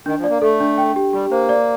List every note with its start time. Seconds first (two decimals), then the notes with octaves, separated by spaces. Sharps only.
0.06 D#3 D4
0.18 F3
0.24 D5
0.30 A#3
0.42 A3 A4
0.60 D4
0.78 G5
0.96 G4
1.13 G3 G4
1.31 A#3 C5
1.49 D5